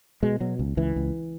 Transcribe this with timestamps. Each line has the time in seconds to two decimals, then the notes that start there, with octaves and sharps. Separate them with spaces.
0.23 B2 G#3
0.40 B2 F#3
0.59 C#2
0.77 C#2 E3
0.96 C#2